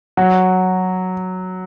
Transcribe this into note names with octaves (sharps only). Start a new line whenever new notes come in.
F#3